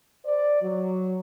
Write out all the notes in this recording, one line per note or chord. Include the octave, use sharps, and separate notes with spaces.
C5 D5
F#3